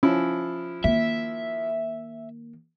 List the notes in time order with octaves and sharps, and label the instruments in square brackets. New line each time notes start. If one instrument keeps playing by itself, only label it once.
[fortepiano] F3 E4 [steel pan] C#4
[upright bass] D#3 A#3 [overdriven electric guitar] E5